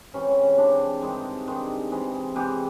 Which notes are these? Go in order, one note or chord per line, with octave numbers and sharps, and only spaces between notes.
C3 E3 G#3 C#4
C#4
C#4
C3 E3 G#3 D4
G2 D#3 G#3
G2 D#3 G#3
C3 E3 G#3
C3 E3 G#3 G4